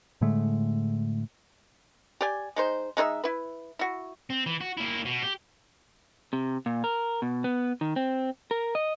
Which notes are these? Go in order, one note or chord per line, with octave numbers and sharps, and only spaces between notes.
A2 D3 G#3 A3
G4 D5 G#5
G#3 D#4 C5
G#3 D#4 C5 E5
E4 B4
E4 F#4
C4
E3
F#4
A#3 E4
B2
G4
C3
A#2
A#4
B2
B3
D#3
C4
A#4
D#5